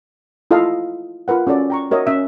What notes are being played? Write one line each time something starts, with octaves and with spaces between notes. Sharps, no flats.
E4 F4 A4 D#5 F5
F4 A#4 B4 F#5
C#4 F#4 A4 D5
G5 A#5 C#6
F#4 A#4 C#5 D#5 E5
C#4 E5 D#6